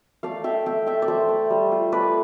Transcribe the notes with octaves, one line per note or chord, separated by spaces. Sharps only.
A3 D5 F5
A3 E5 G5
A3 E5 G5
A3 E5 G5
D5
A3 C5 E5
A3
G3
F4
A3 B4 D5